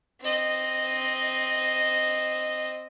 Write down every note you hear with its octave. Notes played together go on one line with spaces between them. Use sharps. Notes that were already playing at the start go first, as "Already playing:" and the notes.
C4 D#5